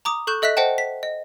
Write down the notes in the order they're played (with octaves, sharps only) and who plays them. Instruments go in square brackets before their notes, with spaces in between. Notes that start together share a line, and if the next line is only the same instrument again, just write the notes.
[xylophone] A#5 D6 D#6
A4 C#6 F#6 G6 E7
A4 D#5 E5 F#6 B6
C5 D#5 F#5 G5 A5
B6
D#5